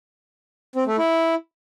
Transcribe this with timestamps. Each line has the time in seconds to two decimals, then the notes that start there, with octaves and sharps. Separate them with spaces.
0.76 C4
0.87 A3
0.98 E4